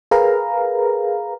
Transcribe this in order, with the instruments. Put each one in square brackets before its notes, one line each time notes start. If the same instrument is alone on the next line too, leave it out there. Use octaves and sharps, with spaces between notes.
[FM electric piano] G#4 A#4 B4 F5 A#5